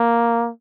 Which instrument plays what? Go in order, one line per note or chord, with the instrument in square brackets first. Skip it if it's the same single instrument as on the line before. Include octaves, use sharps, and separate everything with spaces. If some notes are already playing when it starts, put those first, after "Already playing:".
Already playing: [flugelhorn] A#3